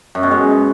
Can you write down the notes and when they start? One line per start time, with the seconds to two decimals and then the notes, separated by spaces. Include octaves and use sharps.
0.15 F#2
0.23 B2
0.31 G#3